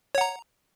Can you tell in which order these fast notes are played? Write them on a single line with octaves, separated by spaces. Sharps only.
C#5 F#5 A#5